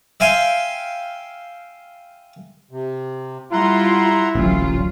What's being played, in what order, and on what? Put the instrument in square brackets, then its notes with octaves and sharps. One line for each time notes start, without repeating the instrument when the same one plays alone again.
[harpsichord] E5 F5 G5 G#5 C6
[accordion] C3
[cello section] G3 F4 [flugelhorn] E4 [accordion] F#5 A#5 C6
[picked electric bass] D1 A1 [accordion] A#2 [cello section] F#3 F4